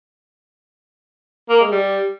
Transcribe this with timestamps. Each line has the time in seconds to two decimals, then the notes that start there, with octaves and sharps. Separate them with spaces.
1.49 A#3
1.60 G#3
1.72 G3